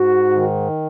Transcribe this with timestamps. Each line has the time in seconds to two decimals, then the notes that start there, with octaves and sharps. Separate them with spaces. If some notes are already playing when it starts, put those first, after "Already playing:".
Already playing: G#2 F#4
0.36 D#3